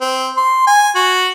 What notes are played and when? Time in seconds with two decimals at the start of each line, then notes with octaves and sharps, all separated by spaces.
0.01 C4
0.37 C6
0.67 G#5
0.96 F#4